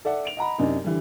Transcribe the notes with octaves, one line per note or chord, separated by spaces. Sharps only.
A4 D5 E5 F#5
D7 F7
D#5 F#5 A#5 B5
F#2 C3 D4 D#4
D3 E3 G3